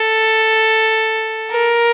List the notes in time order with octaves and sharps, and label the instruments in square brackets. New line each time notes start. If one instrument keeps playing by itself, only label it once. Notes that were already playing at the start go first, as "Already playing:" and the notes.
Already playing: [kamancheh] A4
A#4